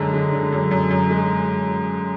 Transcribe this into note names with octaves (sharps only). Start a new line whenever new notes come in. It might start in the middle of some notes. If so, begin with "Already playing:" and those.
Already playing: F#2 D3 G#3
G#3
D3
F#2
F#2
F#2
G#3